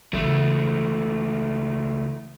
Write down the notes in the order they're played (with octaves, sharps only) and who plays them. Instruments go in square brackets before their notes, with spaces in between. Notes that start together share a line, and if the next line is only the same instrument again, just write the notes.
[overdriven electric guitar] C#2 A3 [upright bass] C#3 E3